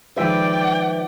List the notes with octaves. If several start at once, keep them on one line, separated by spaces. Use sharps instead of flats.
D#3 F3 G#3 B4 D5 E5 G5